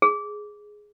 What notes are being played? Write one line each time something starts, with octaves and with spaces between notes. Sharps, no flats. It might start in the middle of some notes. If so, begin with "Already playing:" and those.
G#4